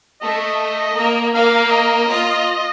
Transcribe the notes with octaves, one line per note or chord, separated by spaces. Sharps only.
A3 D#5
A#3
A#3 F5
D#5
F4